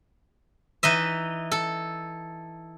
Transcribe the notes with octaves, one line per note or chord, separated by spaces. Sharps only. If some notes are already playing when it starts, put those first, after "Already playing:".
E3 D#4 D#5 E5
A4